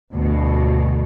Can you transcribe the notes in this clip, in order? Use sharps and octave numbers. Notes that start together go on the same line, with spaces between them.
D2 G2 B2